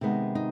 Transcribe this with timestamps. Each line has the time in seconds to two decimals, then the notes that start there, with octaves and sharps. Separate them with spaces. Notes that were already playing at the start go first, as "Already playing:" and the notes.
0.01 C3 D#3 G#3 B3 D#4
0.35 D#4